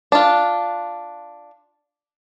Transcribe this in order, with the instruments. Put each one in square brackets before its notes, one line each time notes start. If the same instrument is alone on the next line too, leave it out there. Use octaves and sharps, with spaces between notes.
[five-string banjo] D4 F4